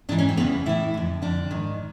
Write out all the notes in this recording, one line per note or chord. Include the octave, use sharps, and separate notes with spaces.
G#2 E3 D4
C#4
C4
E2 C#3 E3 B3
A2 E3 E4
F2 D3
F2 D3 D4
G#2 D#3